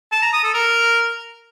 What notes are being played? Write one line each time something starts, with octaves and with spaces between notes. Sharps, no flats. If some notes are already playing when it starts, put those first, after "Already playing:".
A5
A#5
D#6
A4
A#4